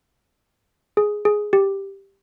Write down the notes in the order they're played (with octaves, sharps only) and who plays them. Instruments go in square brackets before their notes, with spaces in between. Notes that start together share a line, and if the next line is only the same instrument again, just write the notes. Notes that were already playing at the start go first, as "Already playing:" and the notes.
[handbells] G#4
G#4
G4